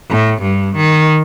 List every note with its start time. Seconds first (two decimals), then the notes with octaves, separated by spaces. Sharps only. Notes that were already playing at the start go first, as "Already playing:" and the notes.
0.10 A2
0.42 G2
0.76 D#3